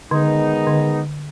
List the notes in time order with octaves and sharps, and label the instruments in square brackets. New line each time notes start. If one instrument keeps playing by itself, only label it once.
[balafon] D3 [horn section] D#3 G#3 B3 D#4
[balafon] D3